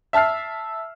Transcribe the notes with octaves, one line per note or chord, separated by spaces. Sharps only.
E5 A5 E6 F6 C7